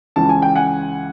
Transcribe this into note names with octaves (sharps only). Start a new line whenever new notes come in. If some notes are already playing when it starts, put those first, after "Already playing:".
C#2 C#3 E3 A5
G#5
G5
F#5 G#5